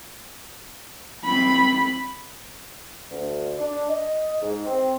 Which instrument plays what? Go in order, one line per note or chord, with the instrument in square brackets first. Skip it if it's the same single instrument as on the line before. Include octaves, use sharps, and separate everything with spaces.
[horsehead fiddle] C4 B5
[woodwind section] D2
D4
D#5
G#2
C4